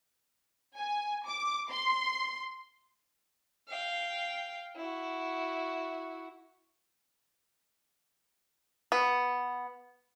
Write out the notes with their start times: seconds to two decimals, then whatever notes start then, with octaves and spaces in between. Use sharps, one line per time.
0.77 G#5
1.27 D6
1.69 C6
3.68 F5 G5
4.76 E4 F#4
8.92 B3